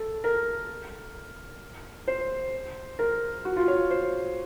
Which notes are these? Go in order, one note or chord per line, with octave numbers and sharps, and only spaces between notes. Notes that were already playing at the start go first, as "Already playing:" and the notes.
Already playing: A4
A#4
C5
A#4
F#4
F4
C#5
C5